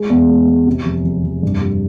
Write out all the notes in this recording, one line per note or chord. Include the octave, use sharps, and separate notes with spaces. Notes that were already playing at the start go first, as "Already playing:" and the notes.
Already playing: G#3
E2
G#3
G#3
C3
F1
F1
F1
G2
G3